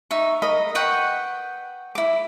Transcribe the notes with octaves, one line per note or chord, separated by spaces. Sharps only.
D#4 E5 C#6
A#4 D#5 B5
B4 F#5 G5 C#6
E4 D6